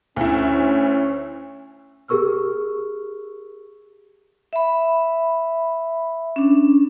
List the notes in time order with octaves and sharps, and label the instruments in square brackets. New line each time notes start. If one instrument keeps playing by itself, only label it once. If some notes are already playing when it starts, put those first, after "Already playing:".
[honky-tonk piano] D2 E4 [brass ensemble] C#4
[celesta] G4 G#4 A#4 C#6 E6 F6
[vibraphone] E5 B5
C#4 D4